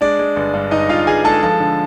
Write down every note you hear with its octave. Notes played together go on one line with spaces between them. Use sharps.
G#3 D4 D5
G#3
G1
G2
G1 D#4 D#5
G1 F4 F5
G1 G#4 G#5
G#3 A4 A5
F3 A4 A5
D3